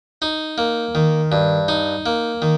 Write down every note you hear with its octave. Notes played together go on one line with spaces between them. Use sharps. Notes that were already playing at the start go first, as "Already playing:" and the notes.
D#4
A#3
D#3
G2
D#4
A#3
D#3